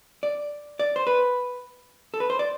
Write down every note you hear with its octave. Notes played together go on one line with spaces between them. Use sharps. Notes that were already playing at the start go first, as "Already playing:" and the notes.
D5
D5
C5
B4
A4
B4
C5
D5